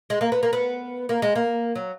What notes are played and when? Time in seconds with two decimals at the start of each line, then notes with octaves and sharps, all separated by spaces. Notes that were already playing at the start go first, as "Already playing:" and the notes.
0.10 G#3
0.21 A#3
0.32 B3
0.43 A#3
0.53 B3
1.09 A#3
1.22 G#3
1.36 A#3
1.76 F#3